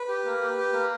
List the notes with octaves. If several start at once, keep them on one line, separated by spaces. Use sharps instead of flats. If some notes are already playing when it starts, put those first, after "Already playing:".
Already playing: B4
G4
A#3
G4
G4
A#3